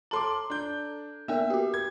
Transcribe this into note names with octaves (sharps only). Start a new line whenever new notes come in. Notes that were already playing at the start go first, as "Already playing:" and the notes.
A4 A5 A#5 C6 D6
D4 G6
A#3 B3 A#4 E5
F#4 G4
G#6